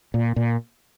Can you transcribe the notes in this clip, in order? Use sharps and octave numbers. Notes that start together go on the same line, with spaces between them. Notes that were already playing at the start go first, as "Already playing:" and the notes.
A#2
A#2